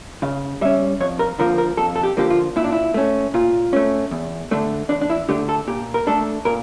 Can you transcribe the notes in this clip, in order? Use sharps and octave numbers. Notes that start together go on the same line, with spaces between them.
C#3 F5
G3 C#4 E5
F2 C#5
A#4
D3 F3 A#3 A#4
A#4
F2 A4
A4
G4
D3 F3 A#3 G4
F4
A#2 E4
D4
E4
A3 C#4
A#2 F4
A3 C#4
E2
D3 A3 D4
E2 D4
D4
E4
D3 A3 D4 G4
A4
A#2 G4
A#4
A3 D4 A4
A#2 A#4